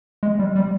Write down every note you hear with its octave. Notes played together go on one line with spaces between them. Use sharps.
G#3
G3
G3